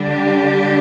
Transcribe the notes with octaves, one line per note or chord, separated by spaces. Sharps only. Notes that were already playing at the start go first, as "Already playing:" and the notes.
Already playing: D3 G3 D4
G4